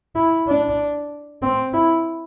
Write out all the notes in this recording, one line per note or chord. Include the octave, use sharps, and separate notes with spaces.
E4
D4
C4
E4